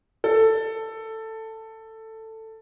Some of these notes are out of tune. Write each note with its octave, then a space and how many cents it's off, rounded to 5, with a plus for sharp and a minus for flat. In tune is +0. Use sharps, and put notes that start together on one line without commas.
A4 +10